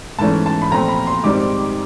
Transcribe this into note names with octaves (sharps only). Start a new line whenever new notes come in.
G#2 E3 A3 C#4 A5
A5
B5
A#2 F3 A3 C4 A#5
B5
C6
G#2 D#3 G3 C4 D6